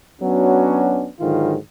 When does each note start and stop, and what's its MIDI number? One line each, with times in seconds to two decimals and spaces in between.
0.22 1.07 54
0.22 1.07 59
0.22 1.07 61
0.22 1.07 62
0.22 1.07 66
1.20 1.55 44
1.20 1.55 50
1.20 1.55 51
1.20 1.55 54
1.20 1.55 65